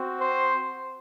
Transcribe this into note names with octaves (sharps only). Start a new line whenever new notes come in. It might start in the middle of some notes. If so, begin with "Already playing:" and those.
Already playing: C4 F#4
C5